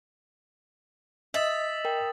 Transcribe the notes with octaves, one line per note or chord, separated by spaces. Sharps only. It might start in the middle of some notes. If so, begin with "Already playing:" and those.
D#5 E5 D#6 A6 F#7
A#4 G5